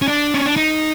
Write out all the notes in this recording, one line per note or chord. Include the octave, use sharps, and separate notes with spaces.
C#4
D4
C#4
D4
D#4